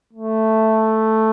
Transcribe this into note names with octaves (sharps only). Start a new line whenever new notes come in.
A3